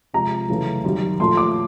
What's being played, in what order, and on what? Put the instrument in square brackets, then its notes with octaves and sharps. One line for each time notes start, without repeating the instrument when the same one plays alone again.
[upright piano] C3 F3 G#3 A#5
F#2 C#3 E3 A3
F#2 D#3 G3
A#2 F3 A3 C6
D6